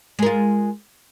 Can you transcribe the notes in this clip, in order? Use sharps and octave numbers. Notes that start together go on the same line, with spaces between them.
G#3 F4 A#4